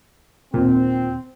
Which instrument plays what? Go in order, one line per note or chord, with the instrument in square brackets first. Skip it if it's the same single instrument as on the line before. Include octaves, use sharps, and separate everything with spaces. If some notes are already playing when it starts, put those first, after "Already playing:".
[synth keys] D#2 A#2 [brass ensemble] C4